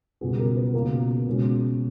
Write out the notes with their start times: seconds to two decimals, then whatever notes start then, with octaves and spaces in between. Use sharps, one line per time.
0.21 C#2 B2 G3 B3 G#4
0.39 A#4
0.56 B4
0.74 C#2 B2 A#3 C#4 A#4
1.27 B2 G#3 C#4